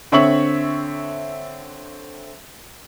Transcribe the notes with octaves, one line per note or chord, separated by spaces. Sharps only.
D3 C4 C#5 E5 C#6 F#7